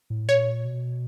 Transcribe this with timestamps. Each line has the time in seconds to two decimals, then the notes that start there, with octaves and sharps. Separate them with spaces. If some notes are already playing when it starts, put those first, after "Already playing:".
0.10 A2
0.28 A#2 C#5
0.65 B2